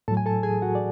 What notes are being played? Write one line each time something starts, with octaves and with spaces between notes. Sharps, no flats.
A2 F#3 A4 A5
G#5
A4 A5
G#4 G#5
F#4 F#5
D5